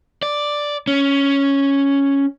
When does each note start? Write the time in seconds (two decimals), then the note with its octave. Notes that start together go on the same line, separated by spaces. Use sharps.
0.23 D5
0.88 C#4